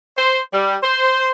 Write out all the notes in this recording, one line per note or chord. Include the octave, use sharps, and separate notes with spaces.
C5
G3
C5